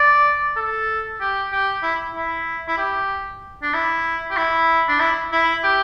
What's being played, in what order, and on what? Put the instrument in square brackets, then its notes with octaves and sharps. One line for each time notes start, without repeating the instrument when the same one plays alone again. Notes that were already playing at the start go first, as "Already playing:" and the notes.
Already playing: [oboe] D5
A4
G4
G4
E4
E4
E4
G4
D4
E4
G4
E4
D4
E4
E4
G4